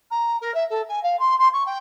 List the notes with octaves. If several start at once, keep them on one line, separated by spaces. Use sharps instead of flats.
A#5
A#4
E5
A4
G#5
F5
C6
C6
C#6
G5